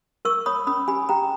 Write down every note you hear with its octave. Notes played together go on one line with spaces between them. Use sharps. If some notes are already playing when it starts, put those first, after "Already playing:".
A#4 C#6 E6
C#5 B5 D#6
C#4 B5 D#6
G4 G#5 B5
G4 G5 A#5